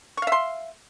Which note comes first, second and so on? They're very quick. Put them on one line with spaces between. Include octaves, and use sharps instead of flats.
C#6 F5 E5 C6